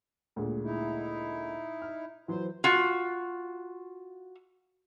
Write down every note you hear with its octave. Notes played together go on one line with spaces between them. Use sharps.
D2 A#2 G#3
D#4 E4
F6
E3 F#3 C5
F4 F#4